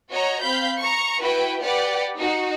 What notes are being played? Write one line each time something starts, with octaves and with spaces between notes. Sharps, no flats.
F#4 C#5 D#5 A#5
C4 F5 B5 G6
A#5 C#6
E4 F#4 B4 G5
G4 B4 D5 F#5
D#4 F#4